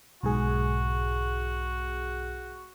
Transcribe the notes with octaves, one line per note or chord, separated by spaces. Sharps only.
B1 G#2 F#4 G#4